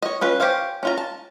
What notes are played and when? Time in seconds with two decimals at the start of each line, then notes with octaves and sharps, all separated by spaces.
0.02 C#5 D#5
0.21 C#4 F4 B4
0.40 G4 C5 C#5 F5 G#5
0.83 C#4 F4 A#5
0.98 A5